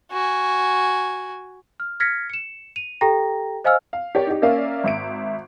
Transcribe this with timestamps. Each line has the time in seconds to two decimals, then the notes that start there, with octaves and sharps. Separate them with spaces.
0.11 F#4 G#5
1.80 F6
2.00 F6 G#6 A#6 B6 C#7
2.30 C#7 E7
2.76 D#7 F7
3.01 G4 A4 G5 A#5 A#6
3.64 C5 D#5 F5 G#5 E6 F6
3.93 F5
4.15 G4 A#4 C#5 D5
4.27 D#4 G4
4.42 A#3 C#4 A#4 D5 E5 F5
4.84 G#1 E5 D7